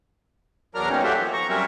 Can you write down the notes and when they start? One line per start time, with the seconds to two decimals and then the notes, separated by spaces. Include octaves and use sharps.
0.75 E2 F#3 D4 A#4 A#5 F6
0.89 B2 D#3 G3 A#3 C#4
1.04 F#4 G4 A4 C5 E5
1.18 F3
1.33 A#5 C#6
1.49 F#3 G3 C4 C#4 A#4 E5